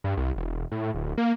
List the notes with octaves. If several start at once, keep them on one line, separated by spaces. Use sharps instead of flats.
G2
C2
E1
A2
D1
A#3